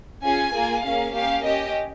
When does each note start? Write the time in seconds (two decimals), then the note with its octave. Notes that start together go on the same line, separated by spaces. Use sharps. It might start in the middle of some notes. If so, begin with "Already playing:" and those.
0.24 C#4 F4 G#4 G#5
0.54 A#3 F4 G#4
0.84 A#3 C#4 G#4 F5
1.13 A#3 C#4 G4 F5
1.43 C#4 G4 D#5